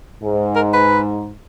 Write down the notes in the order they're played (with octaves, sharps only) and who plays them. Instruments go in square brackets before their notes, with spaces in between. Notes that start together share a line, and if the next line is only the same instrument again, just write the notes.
[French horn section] G#2
[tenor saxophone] A#4
B4